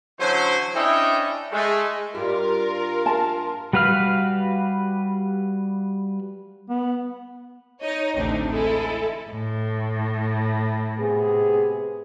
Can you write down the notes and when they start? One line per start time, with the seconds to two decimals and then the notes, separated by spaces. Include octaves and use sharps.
0.19 D3 E3 F#3 C#4 C5
0.75 C#4 D4 E4 A4 D#5 G5
1.52 G#3 A3
2.15 G2 F4 G4 A#4
3.06 A5
3.73 G3 F#4 B4 F5 F6
6.69 B3
7.82 D#4 C#5 D#5
8.15 A1 D2 C3 C4 D4 D#4
8.51 G#3 E4 A4
9.30 A2
10.99 C3 B3 G#4